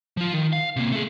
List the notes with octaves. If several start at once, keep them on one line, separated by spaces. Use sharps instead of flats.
F3 F4
D#3
F5
C3 A#3
A3 G#4